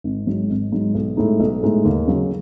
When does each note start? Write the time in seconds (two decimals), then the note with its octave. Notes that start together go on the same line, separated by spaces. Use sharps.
0.04 G#1
0.27 G#2 F#3
0.50 G#1
0.72 G#2 F#3
0.94 B1
1.17 A2 G#3 D#4
1.40 B1
1.63 A2 G#3 D#4
1.85 D#2
2.07 C#3 F#3